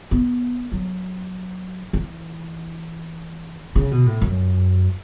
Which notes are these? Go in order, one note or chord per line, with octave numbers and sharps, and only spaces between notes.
B3
F#3
E3
C#3
B2
A2
F#2